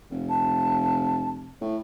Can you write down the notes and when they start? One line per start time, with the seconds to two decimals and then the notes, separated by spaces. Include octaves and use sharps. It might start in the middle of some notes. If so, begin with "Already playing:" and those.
0.11 F1
0.29 A5
1.61 A2